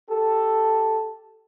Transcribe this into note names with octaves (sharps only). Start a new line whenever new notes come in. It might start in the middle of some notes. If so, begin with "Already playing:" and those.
G4 A4